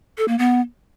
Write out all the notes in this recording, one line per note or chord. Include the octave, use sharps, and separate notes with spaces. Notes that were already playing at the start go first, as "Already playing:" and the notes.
A4
A#3
B3